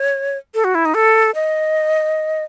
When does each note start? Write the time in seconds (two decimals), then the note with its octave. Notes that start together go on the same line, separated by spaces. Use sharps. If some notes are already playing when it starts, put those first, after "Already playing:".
Already playing: C#5
0.54 A4
0.64 F#4
0.75 E4
0.85 D#4
0.94 A4
1.35 D#5